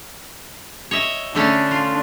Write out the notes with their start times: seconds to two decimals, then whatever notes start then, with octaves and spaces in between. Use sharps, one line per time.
0.91 C#5 D#5 E5
1.35 D3 A3 C#4 D4
1.71 F4